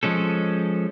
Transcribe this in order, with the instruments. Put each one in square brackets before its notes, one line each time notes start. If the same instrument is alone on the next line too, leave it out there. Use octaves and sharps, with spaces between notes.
[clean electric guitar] F3 G#3 C#4 A4